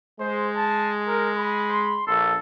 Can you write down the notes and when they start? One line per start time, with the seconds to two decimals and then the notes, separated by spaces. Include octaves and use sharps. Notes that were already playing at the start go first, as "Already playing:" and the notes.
0.19 G#3 C5
0.56 A5
1.07 A#4
1.37 B5
1.69 C6
2.07 A#1 A4